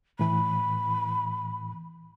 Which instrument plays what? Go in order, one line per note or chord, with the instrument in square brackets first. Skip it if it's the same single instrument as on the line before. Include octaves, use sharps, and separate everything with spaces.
[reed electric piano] A2 E3 [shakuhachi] B5